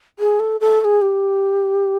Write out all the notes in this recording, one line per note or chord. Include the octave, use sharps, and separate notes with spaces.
G#4
A4
A4
A4
G#4
G4